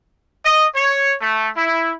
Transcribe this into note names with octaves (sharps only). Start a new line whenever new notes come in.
D#5
C#5
A3
E4